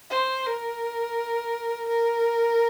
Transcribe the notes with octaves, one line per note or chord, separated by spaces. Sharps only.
C5
A#4
A#4